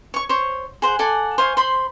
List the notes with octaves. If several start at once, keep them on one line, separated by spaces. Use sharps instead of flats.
C#5 C#6
C5 C#5
G#4 C5 F#5
A4 D5 F#5 G#5
C5 F5 G#5 C#6
C5 B5 C6